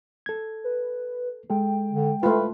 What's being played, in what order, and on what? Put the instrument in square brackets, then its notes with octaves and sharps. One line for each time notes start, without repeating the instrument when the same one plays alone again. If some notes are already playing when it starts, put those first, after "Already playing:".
[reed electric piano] A4 G#6
[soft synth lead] B4
[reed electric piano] G#3 A4 [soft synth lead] G5
[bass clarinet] D3
[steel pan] A3 F4 [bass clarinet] B4